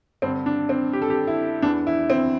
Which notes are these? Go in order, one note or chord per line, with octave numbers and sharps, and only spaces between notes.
G2 D3 C4
D4
C4
G4
A4
G4
E4
E2 E3 D4
E4
C4